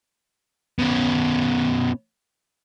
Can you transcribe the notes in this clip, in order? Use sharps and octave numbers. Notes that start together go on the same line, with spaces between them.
B2 C#4